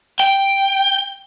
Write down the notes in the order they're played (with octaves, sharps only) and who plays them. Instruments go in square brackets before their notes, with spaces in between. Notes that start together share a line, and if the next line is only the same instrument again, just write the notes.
[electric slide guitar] G5